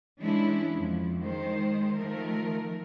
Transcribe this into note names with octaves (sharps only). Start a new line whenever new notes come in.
E3 G#3 C#4 D4 E4
F2
D#3 G#3 C5
D#3 F3 A3 A#4